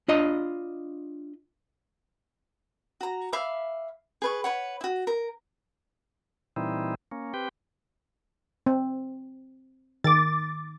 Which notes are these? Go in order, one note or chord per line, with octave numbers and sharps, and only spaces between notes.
D4 F4 D#5
F#4 A#5
E5 F5 B5 D6
G#4 B4 C#6
B4 C#5 F#5
E4 F#4
A#4
A#2 E3 G3 C4 D#4 E4
A#3 C#4
C4 G4 B4 G5
C4
D#3 D6 A6